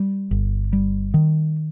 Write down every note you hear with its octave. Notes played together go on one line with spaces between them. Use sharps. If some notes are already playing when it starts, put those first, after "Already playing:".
Already playing: G3
G1
G3
D#3